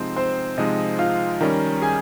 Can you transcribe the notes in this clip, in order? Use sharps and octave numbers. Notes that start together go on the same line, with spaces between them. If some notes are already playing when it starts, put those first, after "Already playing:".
Already playing: C3 F3 G#3 C4 D#4 C5
C4 C5
C3 F3 G#3 D#4 D#5
F4 F5
D#3 G3 C#4 A#4 A#5
G#4 G#5